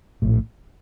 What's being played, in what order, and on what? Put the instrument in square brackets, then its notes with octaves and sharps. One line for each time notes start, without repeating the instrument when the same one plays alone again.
[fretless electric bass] A#1 A2